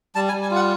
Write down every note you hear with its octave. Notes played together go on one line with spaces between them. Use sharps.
G3 A5
G#5
G3
G#5
F4 F#5